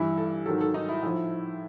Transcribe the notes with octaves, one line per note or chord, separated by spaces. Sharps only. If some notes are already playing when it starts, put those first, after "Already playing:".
Already playing: G2 E3 E4
A4
G#2 D#3 F#3 A4
A4
D#4
E4
A2 F3